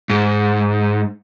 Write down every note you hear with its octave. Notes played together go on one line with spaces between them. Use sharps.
G#2